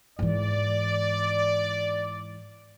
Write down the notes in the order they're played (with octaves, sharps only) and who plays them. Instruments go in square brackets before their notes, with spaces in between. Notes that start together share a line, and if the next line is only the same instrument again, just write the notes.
[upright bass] G#2 E3 [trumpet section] D5